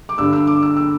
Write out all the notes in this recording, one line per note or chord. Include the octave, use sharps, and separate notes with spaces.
D6
G2 D3 E6
E6
D6
E6
E6